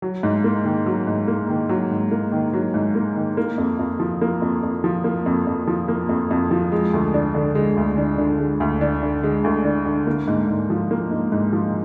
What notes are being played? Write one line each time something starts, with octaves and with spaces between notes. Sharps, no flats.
F#3
G#2
A#3
D#3
F#3
G#2
A#3
D#3
F#3
G#2
A#3
D#3
F#3
G#2
A#3
D#3
A#3
F2
F2
F3
A#3
F2
F2
F3
A#3
F2
F2
F3
A#3
F2
F2
F3
G#3
D2
D4
D3
G#3
D2
D4
D3
G#3
D2
D4
D3
G#3
D2
D4
D3
A#3
G#2
G#2
F3
A#3
G#2
G#2
F3